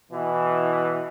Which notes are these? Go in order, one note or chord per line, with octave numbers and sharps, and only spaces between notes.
B2 E3